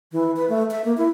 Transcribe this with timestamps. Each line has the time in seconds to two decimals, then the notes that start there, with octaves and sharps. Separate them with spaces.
0.12 E3
0.36 B4
0.49 A3
0.71 E5
0.85 A#3
0.97 E4